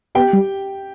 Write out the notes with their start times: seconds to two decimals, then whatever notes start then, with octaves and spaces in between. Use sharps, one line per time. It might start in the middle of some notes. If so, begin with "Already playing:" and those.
0.15 B3 G4 G5
0.33 G3